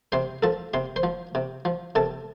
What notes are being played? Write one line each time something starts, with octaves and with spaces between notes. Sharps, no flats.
C3 C5 C6
F3 A4 A5
C3 C6
C5 C6
F3
C3
F3
C3 A4 A5